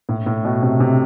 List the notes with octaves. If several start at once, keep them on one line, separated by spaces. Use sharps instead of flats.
A2
A2
B2
C3
C3